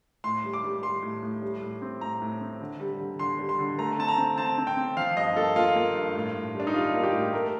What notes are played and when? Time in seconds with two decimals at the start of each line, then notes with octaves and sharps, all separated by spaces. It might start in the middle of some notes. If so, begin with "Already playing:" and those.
0.24 A2 C6
0.44 G3
0.54 D6
0.64 G3
0.83 G3 C6
1.03 A2
1.22 A2
1.42 G3
1.62 A2
1.82 C4
2.01 A2 A#5
2.22 A2
2.41 C4
2.61 D3
2.80 G3
3.00 D3
3.19 D3 C6
3.39 G3
3.49 C6
3.59 D3
3.78 A3 A#5
3.98 C4 A5
4.08 A#5
4.18 C4
4.38 C4 A5
4.58 C4
4.67 G5
4.77 C4
4.97 F3 F5
5.17 G2 D#5
5.36 A#3 A4
5.56 A#3 F4
5.76 A#3
5.95 G2
6.15 A2
6.35 A2
6.55 G3
6.60 D4
6.67 D#4
6.74 G3 F4
6.94 A#3
7.03 G4
7.14 A2
7.33 A3 A#4